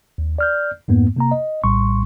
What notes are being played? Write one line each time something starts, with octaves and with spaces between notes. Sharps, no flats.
D#2
D5 F6 G6
F2 G#2 A#3 B3
C3 A#3 A#5
D#5
A#1 A2 G3 C6 C#6